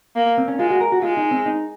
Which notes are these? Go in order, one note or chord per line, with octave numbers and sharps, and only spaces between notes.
A#3
C4
C#4
G#3 F4
F#4
A#4
F#4
G#3 F4
D#4
C4
D#4